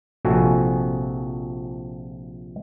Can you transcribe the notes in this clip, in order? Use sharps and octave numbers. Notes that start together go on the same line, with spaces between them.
A#1 C3 F3 F#4 A4 G#5